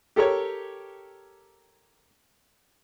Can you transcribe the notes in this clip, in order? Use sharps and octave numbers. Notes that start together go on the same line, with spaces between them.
G4 A4 A#4 C#5